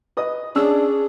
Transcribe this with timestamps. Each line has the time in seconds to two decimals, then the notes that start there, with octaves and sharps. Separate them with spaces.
0.17 B4 D#5 D#6
0.56 C#4 D4 G#4 E6